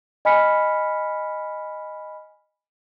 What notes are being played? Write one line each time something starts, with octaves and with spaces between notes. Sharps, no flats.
D#5 G#5 B5 F6 B6 C#7